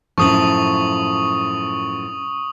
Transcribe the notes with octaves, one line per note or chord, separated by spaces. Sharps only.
F#2 A2 F3 C#6 D#6 F#7